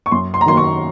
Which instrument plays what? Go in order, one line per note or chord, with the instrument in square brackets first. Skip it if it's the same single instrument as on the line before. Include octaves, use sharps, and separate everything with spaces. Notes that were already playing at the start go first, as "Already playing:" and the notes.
[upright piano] C#6
F#2 C6
C6
A#5
D#3 F#3 A#3 C6
C#6